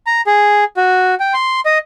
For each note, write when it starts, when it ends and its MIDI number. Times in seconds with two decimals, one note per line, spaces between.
0.07 0.21 82
0.27 0.64 68
0.77 1.15 66
1.20 1.33 79
1.33 1.60 84
1.66 1.78 75